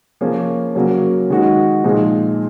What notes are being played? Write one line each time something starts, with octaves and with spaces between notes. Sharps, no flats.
F3 A#3 C#4 G#4
C#3 F#3 A#3 C#4
D#3 G#3 D#4 F#4
A#2 F3 G#3 D#4 G#4